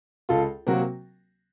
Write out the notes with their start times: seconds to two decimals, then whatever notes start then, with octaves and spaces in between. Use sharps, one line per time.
0.29 C#2 F4 A4
0.67 C3 F#3 A#3 F#4 A#4